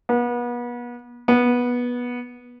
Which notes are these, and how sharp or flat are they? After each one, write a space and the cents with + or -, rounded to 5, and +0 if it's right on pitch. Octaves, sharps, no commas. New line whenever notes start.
B3 -35
B3 -15